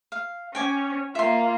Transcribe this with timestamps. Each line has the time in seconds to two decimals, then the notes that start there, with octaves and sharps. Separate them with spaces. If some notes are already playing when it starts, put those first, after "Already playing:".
0.12 F5
0.55 C#4 G5 G#5 D6
1.15 A#3 F4 E5 C6